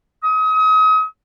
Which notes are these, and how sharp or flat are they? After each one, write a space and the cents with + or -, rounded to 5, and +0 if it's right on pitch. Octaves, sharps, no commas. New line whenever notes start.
D#6 +35